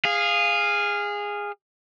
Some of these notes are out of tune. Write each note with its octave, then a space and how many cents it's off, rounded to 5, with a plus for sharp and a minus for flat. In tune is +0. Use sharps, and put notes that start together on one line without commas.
G#4 -15 F5 +0